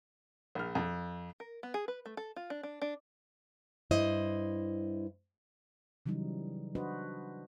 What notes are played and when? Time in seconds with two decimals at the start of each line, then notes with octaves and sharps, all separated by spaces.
0.55 A#1 F6
0.75 F2
1.40 A#4
1.63 B3
1.74 G#4
1.88 B4
2.06 A3
2.17 A4
2.36 F4
2.50 D4
2.63 D4
2.82 D4
3.91 G2 E4 C5 D#5
6.06 C#3 E3 F#3 G3 D#4
6.75 D4 F#4 B4 C5 D#5